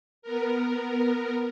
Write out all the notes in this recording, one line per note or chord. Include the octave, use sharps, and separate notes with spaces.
B3 A#4